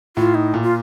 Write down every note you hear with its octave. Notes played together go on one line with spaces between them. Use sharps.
A2 F4
D#4
A#2
F4